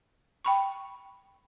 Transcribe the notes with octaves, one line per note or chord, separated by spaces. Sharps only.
G5 B5 C#6